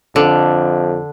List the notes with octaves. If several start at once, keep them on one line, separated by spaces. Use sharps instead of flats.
F2 D3